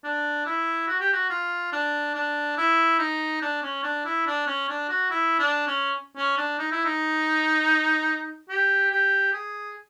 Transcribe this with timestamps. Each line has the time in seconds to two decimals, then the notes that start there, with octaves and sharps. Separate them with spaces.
0.04 D4
0.46 E4
0.88 F#4
1.00 G4
1.13 F#4
1.30 F4
1.72 D4
2.15 D4
2.58 E4
2.99 D#4
3.42 D4
3.63 C#4
3.84 D4
4.05 E4
4.27 D4
4.47 C#4
4.69 D4
4.89 F#4
5.11 E4
5.39 D4
5.67 C#4
6.17 C#4
6.38 D4
6.59 D#4
6.72 E4
6.85 D#4
8.49 G4
8.91 G4
9.33 G#4